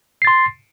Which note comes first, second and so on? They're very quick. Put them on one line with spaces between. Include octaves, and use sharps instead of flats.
C7 A6 C6